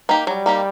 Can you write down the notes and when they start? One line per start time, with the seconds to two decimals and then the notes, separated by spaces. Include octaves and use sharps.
0.09 A#3 D#4 G4
0.27 F#3 G3
0.46 A#3 D#4 G4